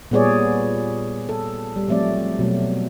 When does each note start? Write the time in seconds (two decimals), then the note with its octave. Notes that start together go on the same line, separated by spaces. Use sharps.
0.11 A#2 G3 B3 G#4 C#5 D5
1.29 A4
1.76 G3
1.88 F3 F#3 A3 C4 D5
2.39 B2 F#3 A3